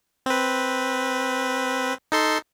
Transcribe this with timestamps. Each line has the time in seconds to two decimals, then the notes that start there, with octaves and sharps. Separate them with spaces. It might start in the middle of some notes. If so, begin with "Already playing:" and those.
0.26 C4 B4
2.12 D#4 A4 C6